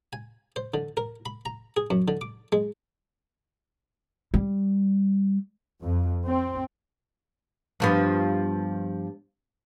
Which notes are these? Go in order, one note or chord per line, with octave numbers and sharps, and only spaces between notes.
G#5
C5
D3
A#4
B5
A#5
G#4
F#2
D3
D6
G#3
G3
F2
C4
G2 F3 B3